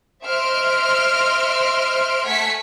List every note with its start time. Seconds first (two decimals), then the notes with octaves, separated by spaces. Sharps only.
0.24 C5 D#5 E5 C6 F6 D7
2.26 A3 F#5 G#5 G#6 B6 C#7